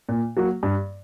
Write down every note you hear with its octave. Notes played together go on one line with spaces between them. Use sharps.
A#2
F#3 A#3 F#4
G2